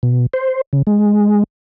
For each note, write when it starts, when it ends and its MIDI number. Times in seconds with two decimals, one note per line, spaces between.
0.03 0.26 47
0.33 0.61 72
0.73 0.82 49
0.87 1.43 56